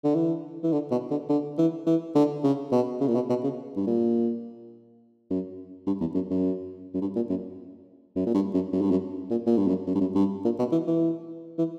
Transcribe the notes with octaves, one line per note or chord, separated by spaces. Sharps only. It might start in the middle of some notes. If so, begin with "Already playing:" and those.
D3
E3
E3
D3
B2
D3
D3
E3
E3
D3
C#3
B2
C#3
A#2
B2
B2
C#3
G2
A#2
F#2
G2
E2
F#2
F#2
F#2
G2
A#2
F#2
F#2
A#2
G2
F#2
F#2
G2
F#2
A#2
A#2
G2
F#2
F#2
G2
F#2
G2
A#2
B2
E3
E3
E3